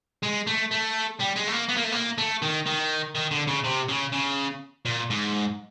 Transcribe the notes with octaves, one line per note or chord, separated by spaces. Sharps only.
G#3
A3
A3
G3
G#3
A3
A#3
B3
A#3
A3
A#3
A3
D#3
D#3
D#3
D3
C#3
C3
C#3
C#3
A#2
G#2